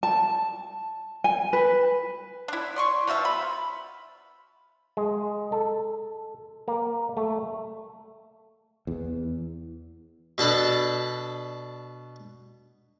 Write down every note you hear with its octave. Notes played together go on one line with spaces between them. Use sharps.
A5
G#5
B4
D4 E4
D5 C6 C#6
B2 F3 F4 E5
B5
G#3
A4
A#3
A3
E2
B2 D4 A4 B5